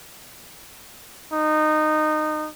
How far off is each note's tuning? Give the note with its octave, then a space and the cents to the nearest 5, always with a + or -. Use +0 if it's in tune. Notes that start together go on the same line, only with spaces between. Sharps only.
D#4 -20